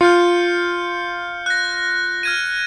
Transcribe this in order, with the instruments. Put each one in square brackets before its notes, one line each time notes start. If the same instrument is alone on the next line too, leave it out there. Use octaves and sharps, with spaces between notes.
[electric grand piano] F4 [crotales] F6 G6 C#7
[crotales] F#6 A#6
F6 G#6 D#7